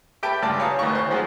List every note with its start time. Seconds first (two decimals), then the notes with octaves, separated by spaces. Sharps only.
0.23 G4 E5 G5 A5 B5
0.42 C#2 G2 D5 A5
0.59 C#5 F5 G#5 A#5 D#6
0.79 G#1 D2 D#3 C#6
0.95 C5
1.11 F3 F#3 G#3 F#4 G#4 C5